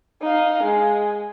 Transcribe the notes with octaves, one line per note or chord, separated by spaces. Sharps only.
D#4 F5
G#3